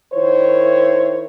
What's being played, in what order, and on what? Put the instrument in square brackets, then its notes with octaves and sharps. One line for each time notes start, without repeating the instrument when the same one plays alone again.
[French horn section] D#3 E4 C5 C#5